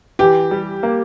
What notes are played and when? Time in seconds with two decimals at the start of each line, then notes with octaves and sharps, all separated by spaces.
0.19 E3 G4
0.51 G3
0.83 A#3